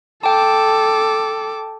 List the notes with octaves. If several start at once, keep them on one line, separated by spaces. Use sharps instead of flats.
A4 G5 A5 D6